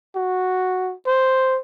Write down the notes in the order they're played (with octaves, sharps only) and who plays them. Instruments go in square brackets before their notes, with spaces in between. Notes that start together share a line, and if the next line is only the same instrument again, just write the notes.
[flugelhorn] F#4
C5